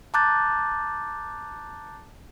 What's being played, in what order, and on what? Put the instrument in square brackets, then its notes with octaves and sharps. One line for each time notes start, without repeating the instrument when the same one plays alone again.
[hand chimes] A5 A#5 D6 F#6 G6 A6